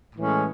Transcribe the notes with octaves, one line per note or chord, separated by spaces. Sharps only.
A2 E3 G#3 C#4